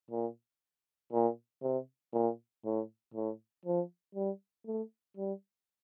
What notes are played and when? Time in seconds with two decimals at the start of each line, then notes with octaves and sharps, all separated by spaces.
0.11 A#2
1.12 A#2
1.63 C3
2.13 A#2
2.65 A2
3.14 A2
3.65 F3
4.15 G3
4.66 A3
5.17 G3